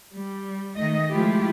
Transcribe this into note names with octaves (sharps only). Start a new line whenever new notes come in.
G3
D#3 A3 D#5
F3 G#3 A3 E4 F4 G4